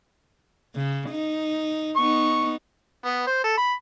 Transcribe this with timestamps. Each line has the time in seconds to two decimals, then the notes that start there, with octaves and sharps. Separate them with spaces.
0.76 C#3
1.10 D#4
1.97 B3 D#4 C#6
3.05 B3
3.27 C5
3.44 A4
3.57 B5